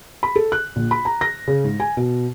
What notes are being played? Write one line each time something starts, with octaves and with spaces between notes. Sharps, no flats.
B5
A4
F#6
A#1
B5
A#5
A#6
C#3
G#2
G#5
B2